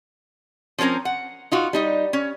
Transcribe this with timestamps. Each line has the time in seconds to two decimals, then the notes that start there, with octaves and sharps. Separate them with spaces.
0.78 F3 C4 C#4 A#4 A#5
1.05 F#5
1.52 D#4 F4 F#4
1.73 G3 D#4 D#5
2.13 C#4